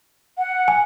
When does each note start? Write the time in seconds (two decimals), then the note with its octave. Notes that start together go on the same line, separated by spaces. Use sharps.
0.38 F#5
0.68 G#5